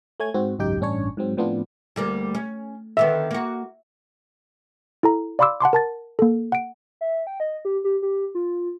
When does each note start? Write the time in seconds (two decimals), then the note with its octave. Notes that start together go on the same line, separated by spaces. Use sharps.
0.20 A3 C#5 G#5 G#6
0.34 G#2 C4 F#4
0.59 G#1 C#2 F#2 D#4 G4 G5
0.80 A1 G2 C#4 D4 C#5
1.17 G#2 F#3 C4
1.37 A2 F3 B3 C4 D4 F4
1.96 D2 G3 A#3
2.35 C#4
2.97 D3 D#3 B3 E5
3.31 A#3 F#4
5.03 E4 A4 A#5
5.39 D5 F5 B5 C6 D6 E6
5.60 F#5 A5 C6 D6
5.73 A#4 A5 A6
6.19 A#3 A4
6.52 F#5 D7
7.01 E5
7.27 G5
7.40 D#5
7.65 G4
7.84 G4
8.02 G4
8.35 F4